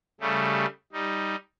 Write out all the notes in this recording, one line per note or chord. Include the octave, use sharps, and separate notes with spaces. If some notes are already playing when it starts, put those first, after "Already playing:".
C#3 G3 A3
G3 D#4